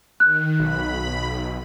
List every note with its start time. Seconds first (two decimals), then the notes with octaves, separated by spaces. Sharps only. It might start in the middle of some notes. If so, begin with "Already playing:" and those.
0.20 D#3 F#6
0.60 B1 B5